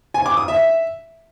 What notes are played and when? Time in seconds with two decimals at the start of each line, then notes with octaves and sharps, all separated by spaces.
0.14 G#5
0.26 D6
0.37 D#6
0.48 E5